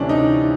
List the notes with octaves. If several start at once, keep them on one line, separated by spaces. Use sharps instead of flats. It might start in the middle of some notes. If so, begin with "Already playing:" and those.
Already playing: D2 C3 E3 G3 C#4 D4
D#4